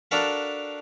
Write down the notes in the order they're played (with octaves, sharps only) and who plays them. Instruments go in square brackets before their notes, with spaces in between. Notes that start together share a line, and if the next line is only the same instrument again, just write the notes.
[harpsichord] D4 F#4 A4 A#4 F5 B5